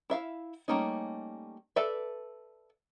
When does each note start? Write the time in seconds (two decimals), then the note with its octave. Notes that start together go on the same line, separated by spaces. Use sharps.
0.10 E4 E5 F5
0.68 G3 A3 A#3 C#4 D#4
1.76 A4 B4 D5 E5